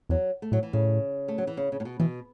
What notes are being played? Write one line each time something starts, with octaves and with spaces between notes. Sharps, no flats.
E2 F#3
A3
A2 F#3
E3
A2 C#3
A3
F#3
E3
C#3
C#3
A2
B2
B2 E3